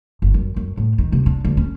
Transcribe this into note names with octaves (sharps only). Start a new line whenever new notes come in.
G1
F#2
F#2
A2
D#3
C3
D4
D2
C#4